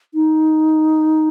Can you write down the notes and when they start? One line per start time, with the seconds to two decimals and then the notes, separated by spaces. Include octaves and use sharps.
0.14 D#4